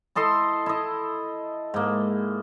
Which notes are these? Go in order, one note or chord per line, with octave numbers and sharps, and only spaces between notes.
E4 A4 D#5 C6
E4 D#5
G#2 A#3